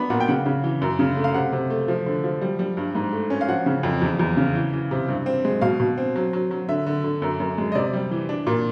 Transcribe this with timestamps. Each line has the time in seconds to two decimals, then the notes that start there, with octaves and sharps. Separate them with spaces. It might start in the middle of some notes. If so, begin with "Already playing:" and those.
Already playing: B3 D4 B5
0.10 A#2 F#5
0.20 G5
0.28 C#3 F#5
0.46 C#3
0.64 E3
0.82 F#2
0.99 C#3
1.17 A3
1.24 F5
1.34 C3 F#5
1.52 C3
1.70 A3
1.88 F3
2.06 D3
2.24 F3
2.41 G3
2.59 G3
2.77 G2
2.95 G#2
3.13 A3
3.30 C#4
3.41 F5
3.48 F3 F#5
3.66 C#3
3.83 F2
4.02 E2
4.19 E2
4.37 C#3
4.55 E3
4.73 E3
4.91 C3
5.08 G2
5.26 C4
5.45 G#3
5.61 B2 F5
5.80 B2
5.98 C4
6.16 F#3
6.33 F#3
6.51 F#3
6.69 D3 E5
6.86 D3
7.04 D3
7.22 F#2
7.40 F#2
7.58 G#3
7.72 D#5
7.75 C3 D5
7.93 G3
8.11 E3
8.29 D4
8.47 A#2